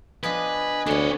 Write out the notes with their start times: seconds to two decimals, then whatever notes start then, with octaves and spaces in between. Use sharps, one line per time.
0.23 F3 B3 D4 B4 D#5 G#5
0.86 D2 D3 B3 D4 C#5